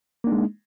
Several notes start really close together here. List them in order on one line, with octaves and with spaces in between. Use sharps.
A#3 D4 D#4 G#3